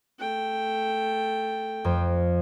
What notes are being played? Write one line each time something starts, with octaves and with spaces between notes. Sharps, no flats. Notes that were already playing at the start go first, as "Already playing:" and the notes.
A3 G5
F2